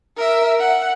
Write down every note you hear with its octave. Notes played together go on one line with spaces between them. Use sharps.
A#4 E5
F#5